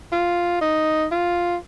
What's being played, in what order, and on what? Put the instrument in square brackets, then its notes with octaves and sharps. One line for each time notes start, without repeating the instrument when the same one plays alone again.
[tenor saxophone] F4
D#4
F4